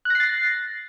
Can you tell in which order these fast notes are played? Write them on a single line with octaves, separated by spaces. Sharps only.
F#6 A#6 C7 A6